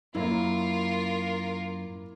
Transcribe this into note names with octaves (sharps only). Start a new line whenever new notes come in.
F#2 A#3 E4 F4 A#4